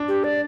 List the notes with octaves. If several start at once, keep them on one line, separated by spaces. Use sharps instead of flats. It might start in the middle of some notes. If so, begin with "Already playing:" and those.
Already playing: D4
G4
D5